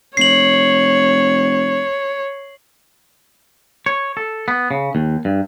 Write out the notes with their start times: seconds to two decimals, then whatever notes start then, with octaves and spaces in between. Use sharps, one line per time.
0.17 F1 C#5 C7 F#7
3.86 C#5
4.17 A4
4.48 B3
4.71 C#3
4.95 D#2
5.25 G2